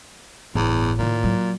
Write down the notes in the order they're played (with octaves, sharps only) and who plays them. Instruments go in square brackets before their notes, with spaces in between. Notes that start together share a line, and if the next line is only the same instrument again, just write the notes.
[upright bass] G1 [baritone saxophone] E2 [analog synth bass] A2
[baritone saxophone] A#2 [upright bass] D#3 D#4
[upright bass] F#3